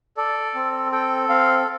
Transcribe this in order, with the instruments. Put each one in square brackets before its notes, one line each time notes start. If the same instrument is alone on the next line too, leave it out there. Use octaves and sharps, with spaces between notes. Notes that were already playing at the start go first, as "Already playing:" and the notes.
[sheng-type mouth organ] A4 D5
C4
A4 G5
C4 F5